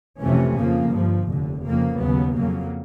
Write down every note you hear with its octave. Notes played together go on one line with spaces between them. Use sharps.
F2 C3 E3 A3 C#4
F2 C#3 F3 A#3
G2 D3 F3
F1 D#2 D3
F2 C#3 F3 A#3
D#2 C#3 F#3 B3
F2 C#3 F#3 A#3